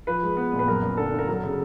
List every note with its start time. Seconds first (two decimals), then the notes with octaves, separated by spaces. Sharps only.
0.07 F3 B4
0.23 G#3
0.37 B3
0.53 A#2
0.59 B4
0.68 F#2 A#4
0.82 F#2
0.97 D3 A4
1.14 D3 A#4
1.28 F#3 A4
1.43 C#3